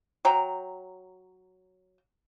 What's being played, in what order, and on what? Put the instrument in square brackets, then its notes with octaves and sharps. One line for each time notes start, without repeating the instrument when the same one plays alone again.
[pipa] F#3 G5 A#5